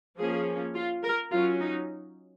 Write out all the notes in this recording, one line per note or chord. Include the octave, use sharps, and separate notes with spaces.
F3 A#3 C#4 G#4
F4
A#4
F#3 C#4 F4
D#4